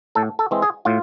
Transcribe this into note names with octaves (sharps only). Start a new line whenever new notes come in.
A2 A4
A4
E3 G#3 C4
G#4
A2 F4